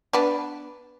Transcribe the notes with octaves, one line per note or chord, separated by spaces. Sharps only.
B3 D4